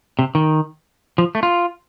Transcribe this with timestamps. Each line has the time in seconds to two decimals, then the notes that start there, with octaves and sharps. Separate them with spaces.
0.19 C3
0.35 D#3
1.18 F3
1.35 A3
1.43 F4